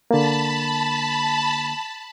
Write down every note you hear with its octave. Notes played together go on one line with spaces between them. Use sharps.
D3 A#3 A5 B5